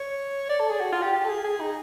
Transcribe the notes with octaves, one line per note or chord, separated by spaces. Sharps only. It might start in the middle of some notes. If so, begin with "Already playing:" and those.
Already playing: C#5
D5
A4
G#4
F#4
F4
G4
G4
A4
G#4
G#4
D#4